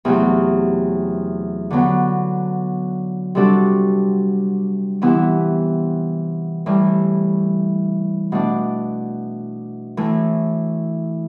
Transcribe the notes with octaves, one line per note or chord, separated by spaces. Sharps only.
E2 C3 F#3 A3
D3 F#3 B3
C3 G3 D4 F#4 A4
C3 E3 B3 E4
A2 E3 G3
B2 A3 D4
A2 E3 A3